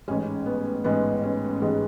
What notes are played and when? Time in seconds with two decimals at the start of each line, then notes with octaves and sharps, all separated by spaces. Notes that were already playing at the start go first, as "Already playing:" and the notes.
0.08 A1 G#2 G#3 C#4
0.46 B3
0.84 A1 G#2 G#3 B3
1.23 C#4
1.61 A1 G#2 G#3